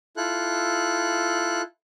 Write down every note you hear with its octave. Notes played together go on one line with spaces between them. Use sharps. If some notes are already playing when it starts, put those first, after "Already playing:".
E4 F4 A4 F#6